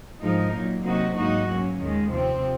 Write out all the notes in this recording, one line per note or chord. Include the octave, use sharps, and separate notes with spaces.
G#2 F3 G#3 D#4 A#4
A#2 F#3 A#3
C3 F#3 A#3 D#4 F#4
G#2 F#3 A#3 D#4 F#4
F#3 A#3 C#4
D#2 D#3 G#3
C3 F3 C4